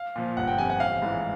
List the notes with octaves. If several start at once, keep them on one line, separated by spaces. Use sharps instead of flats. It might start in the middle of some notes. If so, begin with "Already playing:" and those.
Already playing: F5
A#2 F3
G1 F#5
G5
F2 C3 G#5
F#5
A1 F5
G#2 E3